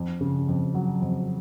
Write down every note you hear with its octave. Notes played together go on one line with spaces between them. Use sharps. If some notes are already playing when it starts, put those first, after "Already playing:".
Already playing: F2
C#3
F2
F#3
F2